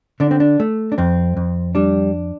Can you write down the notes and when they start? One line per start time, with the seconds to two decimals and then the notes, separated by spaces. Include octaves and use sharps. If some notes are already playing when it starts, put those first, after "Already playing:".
0.20 D3 D4
0.31 C4
0.40 D4
0.60 A3
0.92 D4
0.98 F2 C4
1.37 F2
1.75 G3 D4